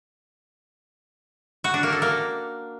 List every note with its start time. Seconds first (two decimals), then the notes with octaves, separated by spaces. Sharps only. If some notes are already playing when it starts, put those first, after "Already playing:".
1.64 F#4
1.74 D4
1.83 A#3
1.93 A4
2.02 A#3